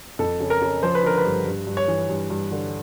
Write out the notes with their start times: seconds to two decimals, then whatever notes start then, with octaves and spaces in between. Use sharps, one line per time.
0.19 F2 A4
0.40 C#3
0.50 A#4
0.61 C#3
0.83 F3 C5
0.95 B4
1.04 D3 A#4
1.18 B4
1.25 G2
1.45 G2
1.67 G2
1.77 C#5
1.88 E3
2.09 G2
2.30 G2
2.51 D3